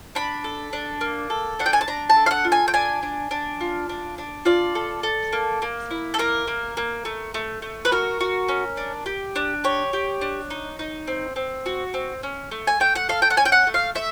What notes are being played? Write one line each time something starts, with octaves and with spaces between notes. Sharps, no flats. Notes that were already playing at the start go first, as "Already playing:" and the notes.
D4 B5
A4
D4
A#3
A4
D4 F#5
G5
G#5
A5
D4 A#5
A5
A4
F5
F#5
F4
G#5
G5
D4 G#5
D4
D4
F4
D4
D4
F4 D5
A4
A4
A#3
A#3
E4
A4
A#3 A#4
A#3
A#3
A3
A3
A3
B4
F#4 A#4
F#4
C#4
D4
G4
D4
G4 C#5
G4
D4
D#4
D#4
C4
C4
F#4
C4
C#4
A3
G#5
A3 G5
F#5
A4 F5
G5
F#5
C#4 G#5
G5
F#5
A3
F5
A3 E5